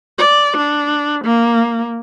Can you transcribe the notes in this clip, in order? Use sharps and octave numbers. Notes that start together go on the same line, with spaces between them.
D5
D4
A#3